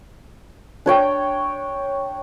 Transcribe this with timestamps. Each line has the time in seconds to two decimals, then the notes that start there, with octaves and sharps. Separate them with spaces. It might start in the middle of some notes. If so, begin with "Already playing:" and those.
0.86 D4 C#5 G5